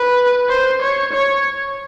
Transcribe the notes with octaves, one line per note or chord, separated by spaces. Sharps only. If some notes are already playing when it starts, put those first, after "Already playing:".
Already playing: B4
C5
C#5
C#5